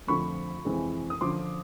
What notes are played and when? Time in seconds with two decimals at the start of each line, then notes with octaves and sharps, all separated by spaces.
0.07 F2 D3 F3 A3 C4 B5 C#6
0.65 F2 C3 E3 G#3 C4
1.10 D#6
1.21 F#2 D3 F3 C6 D6